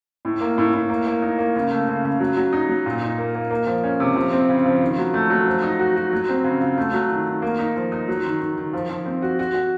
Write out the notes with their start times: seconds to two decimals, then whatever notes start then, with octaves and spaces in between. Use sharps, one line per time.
0.25 A2
0.41 A#3
0.58 A2
0.74 A2
0.89 A#3
1.07 A#3
1.22 D#4
1.38 A#3
1.56 C#3
1.71 A3
1.88 C#3
2.04 C#3
2.20 F#3
2.37 F#3
2.53 D#4
2.69 F#3
2.86 A#2
3.02 D#4
3.18 A#3
3.35 A#3
3.50 A#3
3.67 F3
3.84 C#4
4.00 C3
4.16 F3
4.33 C4
4.49 C#3
4.66 F3
4.82 D#3
4.98 F#3
5.14 A3
5.30 F#3
5.47 F3
5.63 D#4
5.79 F#4
5.96 F#4
6.12 F#3
6.29 C4
6.44 C#3
6.60 F4
6.78 A3
6.93 F#3
7.11 D#3
7.27 D#3
7.42 A#3
7.59 D#4
7.76 F3
7.92 D#4
8.08 F#3
8.25 D#3
8.40 D#3
8.57 D#3
8.73 F3
8.90 F3
9.06 C4
9.22 F#4
9.39 F#4
9.54 F#4